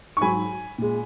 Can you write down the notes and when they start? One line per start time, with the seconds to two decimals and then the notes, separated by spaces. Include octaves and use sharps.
0.17 C#6
0.21 G#2 F#3 G#5 B5
0.78 A#2 G#3